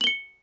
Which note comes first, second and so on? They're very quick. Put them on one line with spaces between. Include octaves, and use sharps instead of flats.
F#7 G7 C#7